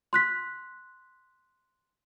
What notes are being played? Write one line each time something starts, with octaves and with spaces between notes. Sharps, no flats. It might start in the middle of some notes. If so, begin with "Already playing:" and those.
C6 F#6 B6